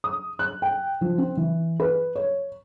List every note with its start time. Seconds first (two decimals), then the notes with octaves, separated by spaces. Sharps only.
0.04 D#6
0.39 F#6
0.62 G5
1.01 F3
1.18 C4
1.37 E3
1.80 B4
2.16 C#5